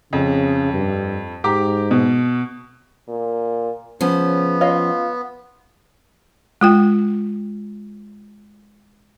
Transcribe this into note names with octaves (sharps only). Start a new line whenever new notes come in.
F2 C#3
G2
G#2 G4 A#5 D6
B2
A#2
C#3 F3 B3 C#4
F4 C#5 D#5 F5
G#3 F4 G5